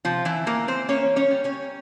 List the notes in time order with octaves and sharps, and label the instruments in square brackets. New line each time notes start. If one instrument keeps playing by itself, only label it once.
[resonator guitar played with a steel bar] C3 F3 F4
E3 E4
E3 A#3 A#4
C4 C5
A#3 C#4 C#5
C#4 C#5
G3
C#4 C#5